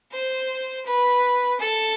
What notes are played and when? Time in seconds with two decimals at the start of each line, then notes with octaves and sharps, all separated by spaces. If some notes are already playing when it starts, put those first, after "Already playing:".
0.12 C5
0.85 B4
1.59 A4